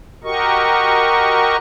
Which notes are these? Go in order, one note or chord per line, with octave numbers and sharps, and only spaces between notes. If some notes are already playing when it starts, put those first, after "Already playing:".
F#4 G4 A#4 D#5 C#6